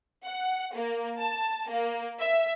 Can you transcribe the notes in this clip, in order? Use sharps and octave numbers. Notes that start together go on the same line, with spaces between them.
F#5
A#3
A5
A#3
E5